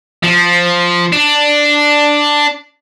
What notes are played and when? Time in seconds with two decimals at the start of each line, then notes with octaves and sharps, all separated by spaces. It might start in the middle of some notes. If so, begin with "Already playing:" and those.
0.23 F3
1.12 D4